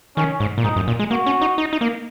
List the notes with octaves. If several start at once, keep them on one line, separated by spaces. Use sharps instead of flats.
D#3 C#4
G#2
A#2
G#2 D#4
F#2
A#2
G#3
A#3 F#4
C#4
D#4
D#4
D#4
A#3